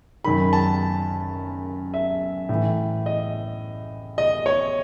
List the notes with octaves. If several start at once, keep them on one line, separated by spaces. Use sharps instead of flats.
F#2 D#3 B5
A5
E5
A2 E3
D#5
D#5
C#5